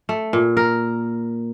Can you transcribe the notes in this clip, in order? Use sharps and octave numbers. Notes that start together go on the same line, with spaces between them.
A3
A#2
A#4